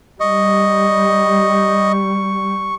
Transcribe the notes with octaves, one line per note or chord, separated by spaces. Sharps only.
G3 D#5 C#6